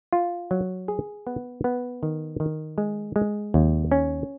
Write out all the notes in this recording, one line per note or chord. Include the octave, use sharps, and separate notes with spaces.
F4
F#3
G#4
B3
B3
D#3
D#3
G#3
G#3
D#2
C#4